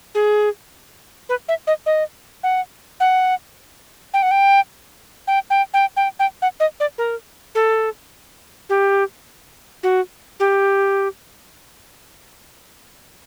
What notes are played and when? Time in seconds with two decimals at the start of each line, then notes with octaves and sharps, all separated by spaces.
0.15 G#4
1.29 B4
1.48 E5
1.67 D#5
1.86 D#5
2.43 F#5
3.00 F#5
4.13 G5
4.22 F#5
4.31 G5
5.27 G5
5.50 G5
5.74 G5
5.96 G5
6.19 G5
6.42 F#5
6.60 D#5
6.80 D5
6.98 A#4
7.55 A4
8.69 G4
9.83 F#4
10.40 G4